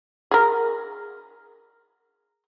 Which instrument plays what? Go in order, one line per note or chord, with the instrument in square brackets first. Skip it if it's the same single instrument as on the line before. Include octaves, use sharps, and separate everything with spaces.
[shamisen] G#4 A#4